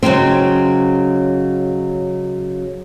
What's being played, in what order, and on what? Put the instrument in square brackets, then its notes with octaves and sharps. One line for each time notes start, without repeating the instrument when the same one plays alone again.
[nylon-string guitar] C#3 F#3 G#3 C4